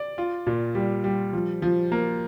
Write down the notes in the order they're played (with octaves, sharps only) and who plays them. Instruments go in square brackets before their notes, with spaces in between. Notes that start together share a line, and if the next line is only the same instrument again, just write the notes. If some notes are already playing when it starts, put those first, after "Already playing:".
Already playing: [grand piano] D5
F4
A#2
G3
G3
F3
F3
A#3